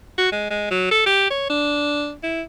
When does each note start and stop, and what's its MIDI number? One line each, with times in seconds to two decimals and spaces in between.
0.18 0.31 66
0.32 0.46 56
0.51 0.66 56
0.71 0.87 54
0.91 1.03 69
1.06 1.26 67
1.31 1.45 73
1.50 2.13 62
2.23 2.42 64